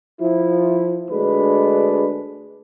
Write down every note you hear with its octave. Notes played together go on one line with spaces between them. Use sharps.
F3 E4
D2 G#3 D4 B4